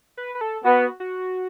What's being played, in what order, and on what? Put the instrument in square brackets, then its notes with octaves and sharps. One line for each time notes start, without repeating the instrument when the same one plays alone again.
[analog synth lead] B4
B4
A4
[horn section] B3 [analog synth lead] F#4
[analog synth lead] F#4